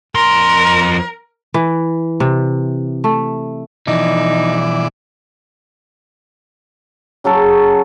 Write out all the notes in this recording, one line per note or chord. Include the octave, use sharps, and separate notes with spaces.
F2 A#4 C6
E3
C3
A3
B2 E3 F3 D#4 D5
C#3 F#3 C#4 A4